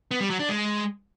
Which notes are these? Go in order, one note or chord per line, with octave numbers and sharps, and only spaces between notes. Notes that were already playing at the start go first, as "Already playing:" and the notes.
B3
G3
F#3
D4
G#3